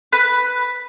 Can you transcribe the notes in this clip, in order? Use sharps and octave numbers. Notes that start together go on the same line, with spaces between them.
B4